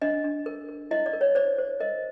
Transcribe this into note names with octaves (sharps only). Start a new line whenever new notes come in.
D4 D#5
D4
A#4
A#4
E4 D#5
D5
A#4
C#5
C5 D5
C5
A#4 D#5